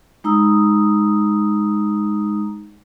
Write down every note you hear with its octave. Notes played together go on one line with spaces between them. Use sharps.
G#3 D#4 A#5 D#6 E6